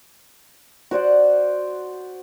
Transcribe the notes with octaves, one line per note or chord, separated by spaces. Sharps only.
F#4 C5 D5 F#5